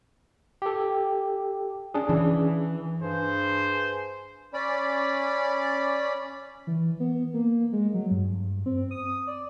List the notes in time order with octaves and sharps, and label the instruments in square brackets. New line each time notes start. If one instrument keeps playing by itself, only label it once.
[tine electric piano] G4 A4
C#4 D4 G#4
[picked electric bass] E3
[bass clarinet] G2 [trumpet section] G#4 C5
[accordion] C#4 D5 B5
[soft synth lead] E3
B3
A#3
G#3
F#3
G2
C4
D#6
D5